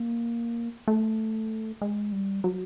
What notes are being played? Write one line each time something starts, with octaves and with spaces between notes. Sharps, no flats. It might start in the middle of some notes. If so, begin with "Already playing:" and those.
Already playing: A#3
A3
G#3
G3
F#3